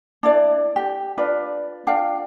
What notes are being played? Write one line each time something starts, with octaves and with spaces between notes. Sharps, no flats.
D4 E4 D5
G4
D4 F4 B4 D5
D4 F4 F5 G5